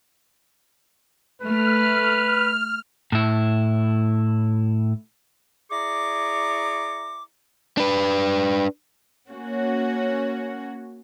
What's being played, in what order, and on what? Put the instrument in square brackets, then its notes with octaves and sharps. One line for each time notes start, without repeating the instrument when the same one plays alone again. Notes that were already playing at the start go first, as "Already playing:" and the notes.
[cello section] A3 [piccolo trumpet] B4 [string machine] F6
[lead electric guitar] A2 E4
[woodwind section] E4 G#4 D5 A#5 C#6 D6
[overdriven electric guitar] D4 B4
[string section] A#3 C#4 F#4